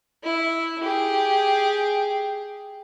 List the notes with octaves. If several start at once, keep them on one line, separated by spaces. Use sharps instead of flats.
E4
G4 G#4